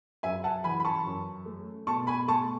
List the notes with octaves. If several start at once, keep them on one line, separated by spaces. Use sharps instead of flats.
F#2 E5 G#5
F#5 A5
E3 G#5 B5
B5
A5 C#6
F#2
A3
B2 A5 C#6
G#5 B5
A3 A5 C#6